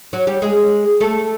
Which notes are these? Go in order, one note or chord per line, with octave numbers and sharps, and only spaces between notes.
F#3 F#4
G3 G4
G#3 G#4
A3 A4